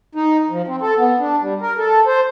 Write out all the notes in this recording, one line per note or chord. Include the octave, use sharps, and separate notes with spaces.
D#4
F3
C4
A4
B3
D4
G3
A#4
A4
C5